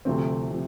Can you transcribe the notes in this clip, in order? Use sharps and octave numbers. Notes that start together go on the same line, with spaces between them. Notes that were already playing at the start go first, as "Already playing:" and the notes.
D2 C3 F3 A3 C4
C3 F3